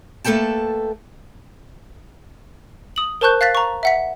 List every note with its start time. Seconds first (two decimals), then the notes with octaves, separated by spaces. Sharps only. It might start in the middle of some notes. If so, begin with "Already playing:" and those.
0.24 A3 A#3 A4 B4 G5 A5
2.96 D#6 F#7
3.21 A#4 C5 A5 C#6 F#6 G6
3.41 F5 F#6 A6 B6
3.55 A#5 C#6
3.83 E5 F#5 B6